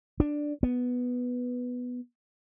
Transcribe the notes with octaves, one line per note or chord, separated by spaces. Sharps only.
D4
B3